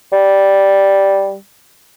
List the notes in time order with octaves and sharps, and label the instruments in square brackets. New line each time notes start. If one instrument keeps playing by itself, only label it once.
[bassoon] G3